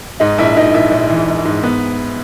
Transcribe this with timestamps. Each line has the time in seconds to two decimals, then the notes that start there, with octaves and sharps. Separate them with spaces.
0.20 G#2 D#4
0.38 A#1 E4
0.57 A#1 D#4
0.74 A#1 E4
0.91 A#1
1.10 E3
1.28 A#1
1.45 G#2
1.63 B3